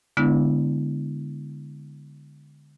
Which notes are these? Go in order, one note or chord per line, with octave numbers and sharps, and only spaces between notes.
D3 G#3 B3 D4 E4